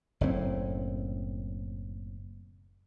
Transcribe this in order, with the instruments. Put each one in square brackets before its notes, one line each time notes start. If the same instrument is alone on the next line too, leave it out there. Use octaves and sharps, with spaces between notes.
[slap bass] F#1 A2 C4